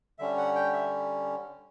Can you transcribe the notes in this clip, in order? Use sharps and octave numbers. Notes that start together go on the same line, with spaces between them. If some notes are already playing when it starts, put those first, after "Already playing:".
D3 G3 C#4 E5
F#5
G5
E5